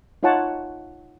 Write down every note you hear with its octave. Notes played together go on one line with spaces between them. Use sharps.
D#4 F4 C#5 F#5 A5